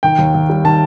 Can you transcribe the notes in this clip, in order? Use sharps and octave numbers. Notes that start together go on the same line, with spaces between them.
D#3 G5
D#2
D#2
G3
D#3 A5